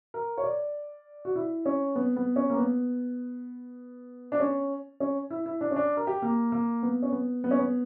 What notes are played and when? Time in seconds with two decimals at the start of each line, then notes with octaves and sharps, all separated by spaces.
0.14 A#4
0.38 C#5
0.43 D5
1.25 F#4
1.35 E4
1.66 C#4
1.96 B3
2.16 B3
2.36 C#4
2.50 A#3
2.56 B3
4.32 D4
4.40 C#4
5.00 C#4
5.30 E4
5.46 E4
5.61 D4
5.71 C#4
5.76 D4
5.97 A#4
6.07 G4
6.22 A#3
6.52 A#3
6.83 B3
7.02 C#4
7.12 B3
7.44 B3
7.51 C#4
7.59 B3